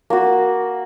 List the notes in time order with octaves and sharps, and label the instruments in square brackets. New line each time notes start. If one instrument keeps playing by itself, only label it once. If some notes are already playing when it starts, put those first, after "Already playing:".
[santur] A#3 F#4